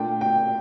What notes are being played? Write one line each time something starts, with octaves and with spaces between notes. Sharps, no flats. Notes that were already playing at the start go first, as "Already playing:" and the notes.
Already playing: A#2 A3 D4 F4 G5
G5